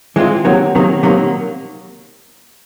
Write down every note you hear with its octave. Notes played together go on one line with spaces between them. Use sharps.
E3 G#3 C4 F4
C3 D#3 F#3 A#3
C3 D#3 F#3 A#3
C3 D#3 F#3 A#3